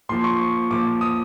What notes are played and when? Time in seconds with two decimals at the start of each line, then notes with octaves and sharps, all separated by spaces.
0.09 A#2 F3 C6
0.24 C#6
0.70 A#2 F3 D6
1.01 D#6